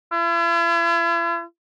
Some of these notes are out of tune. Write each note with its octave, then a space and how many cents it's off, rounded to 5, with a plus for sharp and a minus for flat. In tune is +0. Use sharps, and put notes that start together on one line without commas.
E4 +45